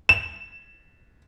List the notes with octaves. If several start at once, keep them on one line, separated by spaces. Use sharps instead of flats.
E7